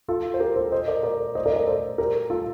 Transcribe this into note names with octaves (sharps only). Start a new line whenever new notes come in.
F4 A4
C5
G4 A#4
A4 C5
C5 D#5
A#4 D5
A#4 D5
C5 D#5
A#4 D5
A#4 D5
A4 C5
G4 A#4
F4 A4